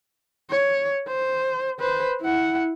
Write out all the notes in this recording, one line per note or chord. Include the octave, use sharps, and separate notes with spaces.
C#5
C5
B4 C5
E4 F#5